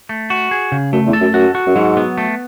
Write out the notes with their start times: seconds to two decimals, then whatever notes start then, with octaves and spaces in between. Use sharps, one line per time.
0.09 A3
0.30 F#4
0.51 G#4
0.72 C#3
0.92 F#2 A3
1.06 E2
1.13 A4
1.21 F#2
1.34 F#2 F#4
1.55 F#4
1.66 F#2
1.76 G#2 F#3
1.97 B3
2.18 A3